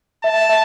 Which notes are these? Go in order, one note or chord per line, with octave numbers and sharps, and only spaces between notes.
E5 A5
E5